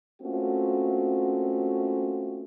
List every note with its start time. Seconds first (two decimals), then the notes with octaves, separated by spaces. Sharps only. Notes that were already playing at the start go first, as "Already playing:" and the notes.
0.22 A3 A#3 C4 C#4 F4 F#4